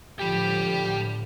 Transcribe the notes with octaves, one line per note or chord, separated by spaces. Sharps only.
A2 D3 F3 G4 G5 B5